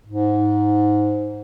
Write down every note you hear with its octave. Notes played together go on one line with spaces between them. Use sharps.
G#2